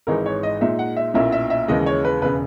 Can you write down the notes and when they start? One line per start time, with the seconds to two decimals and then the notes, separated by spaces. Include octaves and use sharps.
0.07 G#1 G#2 E3 G#3 D#4 A#4
0.26 C#5
0.43 D#5
0.61 A#2 G#3 D#4 E5
0.79 F#5
0.96 E5
1.14 B1 A#2 A#3 C#4 E4 E5
1.32 E5
1.50 E5
1.68 D#2 C#3 E3 G#3 D#5
1.86 C#5
2.05 B4
2.21 E1 C#3 B4